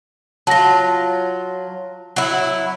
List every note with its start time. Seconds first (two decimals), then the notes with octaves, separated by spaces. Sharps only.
0.47 F#3 F4 A5 A#6
2.16 F#3 E4